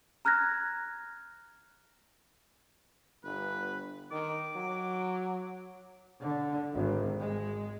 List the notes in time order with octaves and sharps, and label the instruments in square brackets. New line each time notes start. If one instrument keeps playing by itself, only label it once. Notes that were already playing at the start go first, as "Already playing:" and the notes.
[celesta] A#5 F6 F#6 G#6 A#6
[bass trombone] G1 [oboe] B4
[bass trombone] D#3 [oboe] D6
[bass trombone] F#3
[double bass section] D3
G#1
G#3